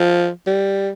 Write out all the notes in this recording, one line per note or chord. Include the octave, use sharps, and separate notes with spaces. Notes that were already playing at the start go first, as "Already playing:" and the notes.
Already playing: F3
G3